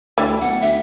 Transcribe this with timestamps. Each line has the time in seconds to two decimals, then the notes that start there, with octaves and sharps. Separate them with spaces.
0.18 D2 E3 G3
0.41 B1 F#5
0.61 D2 E5